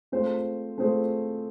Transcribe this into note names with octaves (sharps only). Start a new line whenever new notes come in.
A3 C4 F4 G#4 C5
A3 C4 F4 G#4 C5